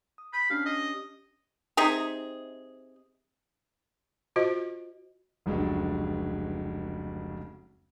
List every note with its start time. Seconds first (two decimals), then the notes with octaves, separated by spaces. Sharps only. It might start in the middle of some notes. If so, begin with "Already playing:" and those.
0.18 D#6
0.33 B5 G6
0.50 C#4 D4 G4 F5
0.66 G4 D#5
1.77 C3 D#4 G#4
4.36 F4 F#4 C5 D#5
5.46 F1 C#2 F#3 G#3 D4